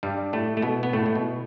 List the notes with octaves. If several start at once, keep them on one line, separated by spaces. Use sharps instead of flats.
G2 G3
A2 A3
A3
B2 B3
B3
A2 A3
A2
B2